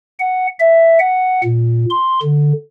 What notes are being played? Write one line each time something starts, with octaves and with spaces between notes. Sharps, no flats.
F#5
E5
F#5
A#2
C6
D3